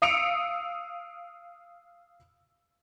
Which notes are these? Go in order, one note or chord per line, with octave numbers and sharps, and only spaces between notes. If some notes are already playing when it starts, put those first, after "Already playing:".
F5 D#6 E6 C#7 D7 F7